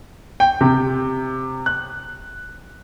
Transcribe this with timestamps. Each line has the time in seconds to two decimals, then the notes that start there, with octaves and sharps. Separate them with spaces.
0.40 G5
0.61 C3
1.66 F#6